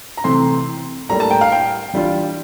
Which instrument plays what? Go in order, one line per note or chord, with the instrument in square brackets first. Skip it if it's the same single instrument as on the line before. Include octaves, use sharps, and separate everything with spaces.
[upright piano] A#5
[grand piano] C3 E3 A3 C4 [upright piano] C6
[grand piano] A2 G3 A#3 [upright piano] A#5
[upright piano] A5
G5
F5
G5
[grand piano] E3 G3 D4 F4